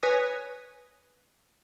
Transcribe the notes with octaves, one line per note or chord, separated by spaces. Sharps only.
B4 C#5 G#5 D#6 A#6